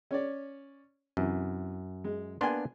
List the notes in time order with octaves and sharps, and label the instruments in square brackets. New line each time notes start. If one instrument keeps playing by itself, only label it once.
[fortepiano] C#4 C#5 D5
[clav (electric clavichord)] F#2 [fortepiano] C3 E3
[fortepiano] G#3
[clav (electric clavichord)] A#3 B3 D4 [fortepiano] G#5 C6